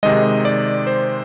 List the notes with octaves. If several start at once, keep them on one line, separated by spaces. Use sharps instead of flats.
C3 D#3 G#3 D#5
D5
C5